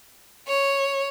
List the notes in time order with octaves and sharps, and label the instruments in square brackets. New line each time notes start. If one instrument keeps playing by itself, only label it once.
[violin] C#5